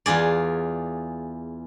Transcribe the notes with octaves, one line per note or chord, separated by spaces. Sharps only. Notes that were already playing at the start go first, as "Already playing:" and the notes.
E2 F4 G#4 D5